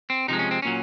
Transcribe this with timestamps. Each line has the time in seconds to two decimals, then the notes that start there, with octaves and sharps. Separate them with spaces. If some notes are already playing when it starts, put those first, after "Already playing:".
0.10 C4
0.28 C3 F3 G#3 D#4
0.39 C#4
0.51 C4
0.62 A#2 F#3 C#4